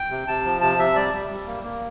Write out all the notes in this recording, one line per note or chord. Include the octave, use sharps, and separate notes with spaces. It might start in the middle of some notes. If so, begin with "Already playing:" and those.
Already playing: G5
C3
C3 A5
F3
C3 A5
C3 E5
G3 D5
G3
G3
A#3
A#3